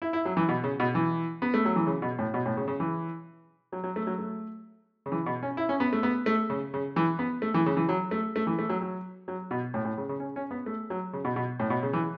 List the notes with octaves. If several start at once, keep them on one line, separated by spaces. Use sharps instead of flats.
E4
E4
F#3
E3
B2
C#3
B2
E3
B3
A3
F#3
E3
C#3
B2
A2
B2
A2
C#3
C#3
E3
F#3
F#3
A3
F#3
A3
C#3
E3
B2
C#4
E4
C#4
B3
A3
B3
A3
C#3
C#3
E3
B3
A3
E3
C#3
E3
F#3
A3
A3
E3
A3
F#3
F#3
F#3
B2
A2
A2
C#3
C#3
C#4
C#4
B3
A3
F#3
C#3
B2
B2
A2
B2
C#3
E3